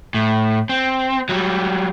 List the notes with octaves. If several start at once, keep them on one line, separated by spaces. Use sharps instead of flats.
A2
C4
F#3 G3